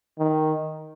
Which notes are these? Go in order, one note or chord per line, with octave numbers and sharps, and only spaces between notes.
D#3